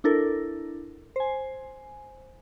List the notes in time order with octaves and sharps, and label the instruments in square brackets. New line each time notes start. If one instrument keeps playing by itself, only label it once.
[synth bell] D4 E4 A4 A#4
C5 G#5